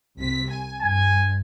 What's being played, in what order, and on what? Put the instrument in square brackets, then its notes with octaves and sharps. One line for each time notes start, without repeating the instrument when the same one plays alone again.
[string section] C2 C3 B6
G#5
[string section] G2 [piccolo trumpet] G#5